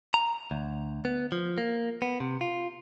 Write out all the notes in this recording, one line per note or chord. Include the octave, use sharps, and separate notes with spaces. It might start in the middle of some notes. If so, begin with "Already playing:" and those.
A#5
D2
B3
F3
A#3
B3
C3
F4